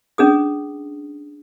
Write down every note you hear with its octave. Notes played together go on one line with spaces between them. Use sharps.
C#4 D4 G#4 D#6